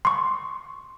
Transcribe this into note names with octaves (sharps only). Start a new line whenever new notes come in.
C6 C#6